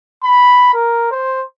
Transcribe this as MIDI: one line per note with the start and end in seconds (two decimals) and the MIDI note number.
0.24 0.72 83
0.74 1.07 70
1.11 1.42 72